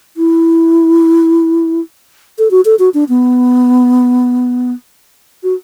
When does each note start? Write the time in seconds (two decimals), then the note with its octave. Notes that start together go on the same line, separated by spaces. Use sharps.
0.17 E4
2.38 A4
2.51 F#4
2.65 A4
2.79 F#4
2.94 D4
3.09 B3
5.43 F#4